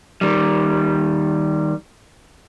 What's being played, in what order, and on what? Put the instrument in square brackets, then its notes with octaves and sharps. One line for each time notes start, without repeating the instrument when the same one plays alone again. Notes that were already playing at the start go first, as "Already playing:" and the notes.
[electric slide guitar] D#3 G3